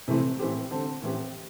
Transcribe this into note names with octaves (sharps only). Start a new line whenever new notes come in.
C3 E3 A3 C4 E4
A2 E3 C4 G4
D3 C4 A4
A2 E3 C4 G4